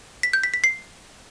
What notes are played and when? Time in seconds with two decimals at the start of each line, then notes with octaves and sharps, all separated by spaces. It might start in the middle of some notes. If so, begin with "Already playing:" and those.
0.23 B6
0.33 G6
0.43 B6
0.54 B6
0.64 C7